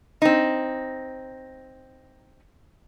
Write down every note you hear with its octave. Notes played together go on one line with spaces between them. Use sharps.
C4 D#4